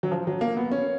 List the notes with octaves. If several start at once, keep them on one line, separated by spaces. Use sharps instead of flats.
F#3
F3
F#3
A#3
B3
C#4